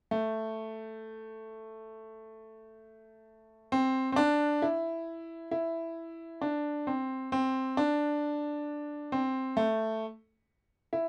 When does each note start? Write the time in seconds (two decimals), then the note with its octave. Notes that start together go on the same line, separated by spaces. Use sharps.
0.11 A3
3.72 C4
4.12 C4
4.16 D4
4.62 E4
5.51 E4
6.41 D4
6.87 C4
7.32 C4
7.77 D4
9.12 C4
9.57 A3
10.93 E4